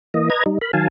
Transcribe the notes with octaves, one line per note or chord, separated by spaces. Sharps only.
E3 A#3 D#5
B4 D#5 A#5 G#6
G3 D#4
A#4 B5
D#3 F#3 F5 G#5 A5